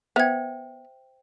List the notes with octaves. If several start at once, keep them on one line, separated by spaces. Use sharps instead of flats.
B3 C5 E5 G5 G#6